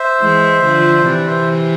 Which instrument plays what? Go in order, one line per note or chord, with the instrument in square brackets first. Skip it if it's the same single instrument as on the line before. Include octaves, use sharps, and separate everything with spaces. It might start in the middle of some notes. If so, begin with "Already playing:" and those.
Already playing: [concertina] C5 E5
[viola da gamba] E3 G#3
D3 F3
[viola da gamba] C3 E3 [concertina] B4 D5
[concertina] C5 E5